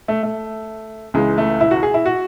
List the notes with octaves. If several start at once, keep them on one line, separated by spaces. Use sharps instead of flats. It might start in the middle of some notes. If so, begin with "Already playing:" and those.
A3
A3
C#2 C#3 E3 G#3
A3
E4
F#4
G#4
E4
F#4